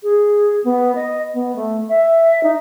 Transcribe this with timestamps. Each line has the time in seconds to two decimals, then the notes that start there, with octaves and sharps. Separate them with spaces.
0.03 G#4
0.64 B3
0.95 D#5
1.34 B3
1.56 A3
1.89 E5
2.43 D#4